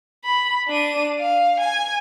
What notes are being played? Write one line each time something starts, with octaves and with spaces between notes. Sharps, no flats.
B5
D4 D#7
F5
G#5